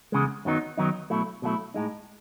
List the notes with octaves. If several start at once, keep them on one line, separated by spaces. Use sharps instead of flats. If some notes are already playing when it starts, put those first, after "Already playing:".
E2 C#3 G#3
F#2 D#3 F#3 B3 D#4
F#2 D#3 F#3 B3 D#4
B2 F#3 A3 E4
B2 F#3 A3 E4
A2 G#3 D#4